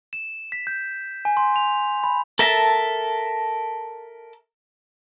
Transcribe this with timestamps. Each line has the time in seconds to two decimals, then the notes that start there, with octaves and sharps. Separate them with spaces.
0.13 E7
0.52 B6
0.67 G6
1.25 G#5
1.37 C6
1.56 F7
2.04 B5
2.39 A4 A#4 E5 A5